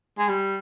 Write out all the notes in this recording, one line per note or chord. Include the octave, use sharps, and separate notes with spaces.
G#3
G3